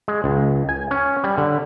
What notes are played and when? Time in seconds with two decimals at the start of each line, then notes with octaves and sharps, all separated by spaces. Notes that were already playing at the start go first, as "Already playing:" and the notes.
0.08 G#3
0.24 C#2
0.69 G#5
0.91 C#4
1.24 G3
1.38 D3